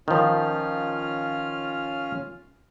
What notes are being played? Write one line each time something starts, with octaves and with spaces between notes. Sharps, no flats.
D#3 F3 C#4 F4 F6